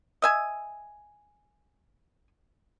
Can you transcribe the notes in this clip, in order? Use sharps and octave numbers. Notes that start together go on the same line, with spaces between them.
D#5 E5 G#5